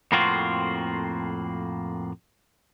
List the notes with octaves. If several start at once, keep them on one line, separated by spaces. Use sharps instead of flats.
F2 A2 A#3 C4 F4 F#4